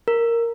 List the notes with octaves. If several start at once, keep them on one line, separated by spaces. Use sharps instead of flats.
A#4